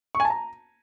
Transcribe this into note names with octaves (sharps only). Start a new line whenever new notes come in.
C#6
G#5
A5
A#5